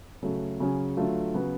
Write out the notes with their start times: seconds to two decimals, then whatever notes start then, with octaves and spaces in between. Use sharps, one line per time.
0.23 C#3 F#3 A3
0.60 C#3 F#3 C#4 G#4
0.97 D3 F#3 A3 F4
1.34 C#3 F#3 B3